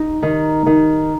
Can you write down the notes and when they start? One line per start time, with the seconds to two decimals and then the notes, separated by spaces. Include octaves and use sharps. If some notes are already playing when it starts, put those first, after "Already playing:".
Already playing: D#4
0.22 D#3
0.66 D#3